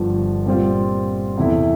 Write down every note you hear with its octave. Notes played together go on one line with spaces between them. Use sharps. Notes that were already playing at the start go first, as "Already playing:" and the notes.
Already playing: G1 G2 F3
A#2 G3 C4 F4
E2 C3 E3 A3 E4